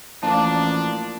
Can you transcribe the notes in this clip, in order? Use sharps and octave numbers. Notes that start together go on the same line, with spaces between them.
A1 F3 A#3 D4 A5